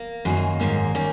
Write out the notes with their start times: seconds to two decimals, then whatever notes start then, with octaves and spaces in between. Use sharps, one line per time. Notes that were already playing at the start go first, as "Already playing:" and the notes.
Already playing: A#3
0.25 F#2 D#3 A#3 G#5
0.37 G#5
0.60 G#2 D#3 A#3 C#4
0.95 D#3 A#3 C#4